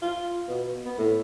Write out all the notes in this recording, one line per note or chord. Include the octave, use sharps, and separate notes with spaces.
F4
B2
B3
A2